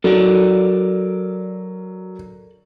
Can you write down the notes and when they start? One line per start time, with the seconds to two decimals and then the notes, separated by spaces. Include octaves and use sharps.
0.04 F#3 A4 A#4 D5